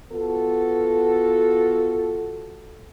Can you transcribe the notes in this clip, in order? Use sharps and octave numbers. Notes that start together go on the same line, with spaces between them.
B3 F4 F#4 A4